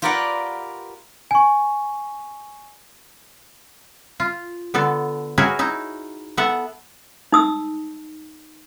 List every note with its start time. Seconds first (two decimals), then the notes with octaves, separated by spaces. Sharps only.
0.02 F4 G4 A#4 B4 D5 F#5
1.31 G#5 C#6
4.20 F4
4.74 D3 B3 A4
5.38 E4 F#4 G#4 A#4 B4 C#5
5.59 D#4 E4
6.37 B3 A4 E5 F#5
7.33 D#4 D#6 E6